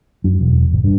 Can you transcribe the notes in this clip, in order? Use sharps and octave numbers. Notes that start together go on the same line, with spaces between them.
F#2
E1
G#1
G2